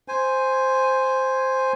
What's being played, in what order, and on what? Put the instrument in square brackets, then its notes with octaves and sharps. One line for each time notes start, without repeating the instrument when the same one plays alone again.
[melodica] C5 G#5